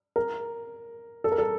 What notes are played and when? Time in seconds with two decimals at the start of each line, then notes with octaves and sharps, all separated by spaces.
0.16 A#4
1.24 A4
1.32 A#4
1.38 A4